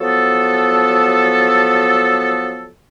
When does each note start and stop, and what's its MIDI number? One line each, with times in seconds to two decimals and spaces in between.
0.01 2.69 53
0.01 2.69 54
0.01 2.69 59
0.01 2.69 69